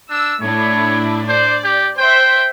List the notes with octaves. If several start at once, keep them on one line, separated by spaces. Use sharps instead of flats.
D4 E6
A2 D4 E4 C#5
C5 D5
G4
C5 E5 G5